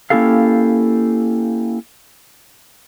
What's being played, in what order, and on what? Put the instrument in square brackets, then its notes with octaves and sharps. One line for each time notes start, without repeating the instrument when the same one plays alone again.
[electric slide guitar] A#3 C#4 E4 G4 A4 F5